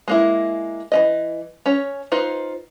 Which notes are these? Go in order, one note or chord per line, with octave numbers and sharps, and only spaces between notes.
G#3 A#3 E4
E3 C#4 D#5
C#4 C#5
D#4 F4 B4 C5